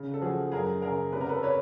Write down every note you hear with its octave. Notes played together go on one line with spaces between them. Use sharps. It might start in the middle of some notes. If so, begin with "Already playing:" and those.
Already playing: C#3
A4
F3 F#4 G#4
F#2 G#4 A#4
C#3 G#4 A#4
C3 B4
A#4
A4 B4
B4 C#5